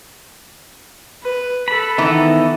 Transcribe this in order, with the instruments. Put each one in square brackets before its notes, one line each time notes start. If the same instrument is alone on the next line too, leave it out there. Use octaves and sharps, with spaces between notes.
[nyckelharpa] B4
[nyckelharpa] A4 [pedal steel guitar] B4 B5
[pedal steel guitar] D#3 B3 D#4 [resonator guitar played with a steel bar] E3 E4